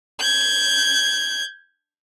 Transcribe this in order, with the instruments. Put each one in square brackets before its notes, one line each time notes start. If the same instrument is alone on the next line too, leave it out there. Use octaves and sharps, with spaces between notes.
[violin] G6 G#6